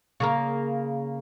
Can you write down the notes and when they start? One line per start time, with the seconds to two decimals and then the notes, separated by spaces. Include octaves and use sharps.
0.20 C#3 A#3 A#4